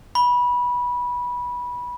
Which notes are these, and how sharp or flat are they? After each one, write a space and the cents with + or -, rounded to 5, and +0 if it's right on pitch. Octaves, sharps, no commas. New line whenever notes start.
B5 -20